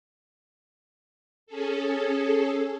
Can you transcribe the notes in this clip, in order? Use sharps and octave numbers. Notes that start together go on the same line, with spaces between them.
C#4 G#4 A4